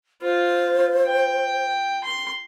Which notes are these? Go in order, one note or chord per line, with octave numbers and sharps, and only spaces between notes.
F4 C5
G5
C6